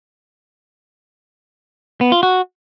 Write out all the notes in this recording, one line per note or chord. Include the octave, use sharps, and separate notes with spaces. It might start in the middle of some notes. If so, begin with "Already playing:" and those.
B3
F4
F#4